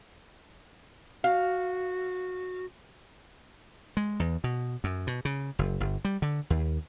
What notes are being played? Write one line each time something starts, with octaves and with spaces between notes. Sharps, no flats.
F#4 F5
G#3
E2
B2
F#2
B2
C#3
F#1
G1
G3
D3
D#2